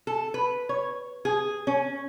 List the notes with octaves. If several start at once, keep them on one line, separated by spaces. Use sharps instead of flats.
A4
B4
C#5
G#4
C#4